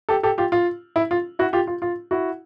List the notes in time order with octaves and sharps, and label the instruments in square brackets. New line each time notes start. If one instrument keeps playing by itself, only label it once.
[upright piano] G4 A4
G4 A4
F4 G4
F4
E4
F4
E4 F#4
F4 G4
F4
F4
E4 F#4